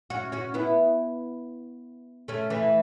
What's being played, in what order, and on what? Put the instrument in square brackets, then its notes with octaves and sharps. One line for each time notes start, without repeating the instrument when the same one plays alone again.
[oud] C#4 F#4
C#4 F#4
B3 E4
A3 C#4
E3 A3